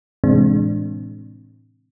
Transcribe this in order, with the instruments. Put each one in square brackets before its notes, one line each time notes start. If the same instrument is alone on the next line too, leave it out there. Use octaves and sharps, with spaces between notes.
[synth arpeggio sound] A2 C3 E3 G#3 C4 D4